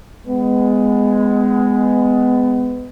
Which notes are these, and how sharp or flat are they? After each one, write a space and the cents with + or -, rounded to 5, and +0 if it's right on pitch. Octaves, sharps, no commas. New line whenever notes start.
G#3 +0 B3 +25